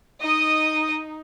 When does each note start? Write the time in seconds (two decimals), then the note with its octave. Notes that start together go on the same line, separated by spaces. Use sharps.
0.21 D#4 D#5 D#6